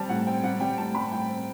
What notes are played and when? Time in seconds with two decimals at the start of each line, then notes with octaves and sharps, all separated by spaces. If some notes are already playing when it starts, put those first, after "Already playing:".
Already playing: G3 C4 A5
0.09 A2 F#5
0.26 C4 G5
0.44 G3 F#5
0.60 G3 G5
0.78 A2 A5
0.95 G3 B5
1.12 A2 G5
1.29 C4